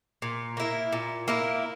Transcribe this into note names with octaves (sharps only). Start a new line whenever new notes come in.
A#2
A#3 E4 A#4
A#2
A#3 E4 A#4